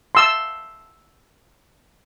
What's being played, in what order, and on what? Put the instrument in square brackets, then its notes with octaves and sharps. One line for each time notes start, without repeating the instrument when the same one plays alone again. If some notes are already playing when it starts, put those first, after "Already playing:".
[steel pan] C6 E6